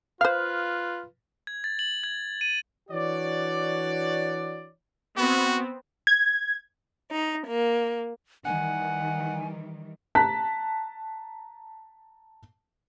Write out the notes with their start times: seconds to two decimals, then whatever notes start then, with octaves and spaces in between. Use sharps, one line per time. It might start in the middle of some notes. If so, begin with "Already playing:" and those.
0.21 F4 B4 C5 F5 F6
1.47 G#6
1.64 A6
1.79 F#7
2.04 G#6
2.41 D#7
2.89 E3 D4 F#4 C#5 D5
5.17 B3 C4 F#4
6.07 G#6
7.10 D#4
7.47 A#3
8.45 D#3 E3 G3 F#5 G#5
10.15 A5 A#5 F#6 B6